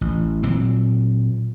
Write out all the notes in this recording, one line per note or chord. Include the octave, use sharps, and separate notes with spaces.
A1
A#2 F#3 C4